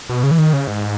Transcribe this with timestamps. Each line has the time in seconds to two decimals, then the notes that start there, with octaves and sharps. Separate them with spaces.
0.09 B2
0.23 C#3
0.31 E3
0.38 D#3
0.53 C#3
0.68 G#2